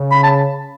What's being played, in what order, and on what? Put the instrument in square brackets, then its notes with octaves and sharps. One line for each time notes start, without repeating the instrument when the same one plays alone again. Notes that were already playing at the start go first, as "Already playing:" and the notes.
Already playing: [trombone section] C#3
[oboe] B5
A5